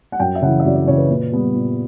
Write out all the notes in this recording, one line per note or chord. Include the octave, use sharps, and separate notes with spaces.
F#5
F#2 G5
E5
C#3 E3 F#5
E5
F#2 D5
D5
C#3 E3 C#5
B4
A#2
G3 B3
A#2